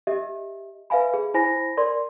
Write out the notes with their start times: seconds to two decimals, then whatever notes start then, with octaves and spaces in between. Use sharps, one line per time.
0.07 G4 D#5 E5
0.90 B4 E5 F5 G#5 B5
1.14 G#4
1.34 E4 C5 G#5 B5 A#6
1.77 A#4 D5 C6